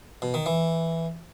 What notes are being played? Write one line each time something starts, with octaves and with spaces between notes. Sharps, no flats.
B2
D#3
E3